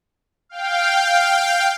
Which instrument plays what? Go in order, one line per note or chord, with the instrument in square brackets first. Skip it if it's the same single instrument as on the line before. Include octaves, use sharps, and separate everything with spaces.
[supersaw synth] F5 G5